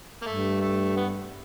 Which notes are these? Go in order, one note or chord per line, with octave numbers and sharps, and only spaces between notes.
A#3
G2 A3
A3
B3